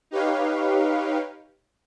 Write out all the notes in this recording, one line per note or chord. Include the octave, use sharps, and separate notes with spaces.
D#4 G4 B4 C#5 F5